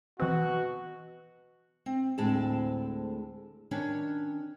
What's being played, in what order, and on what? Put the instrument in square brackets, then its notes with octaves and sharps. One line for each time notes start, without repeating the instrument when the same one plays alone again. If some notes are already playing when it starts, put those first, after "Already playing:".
[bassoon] B2 [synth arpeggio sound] E3 C4 [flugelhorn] F#4
[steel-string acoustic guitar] C4
D2 A2 G#3 C4 A5
D#3 C#4 D4 C#5